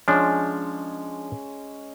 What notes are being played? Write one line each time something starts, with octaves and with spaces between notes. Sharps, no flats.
F3 G#3 C#4 D4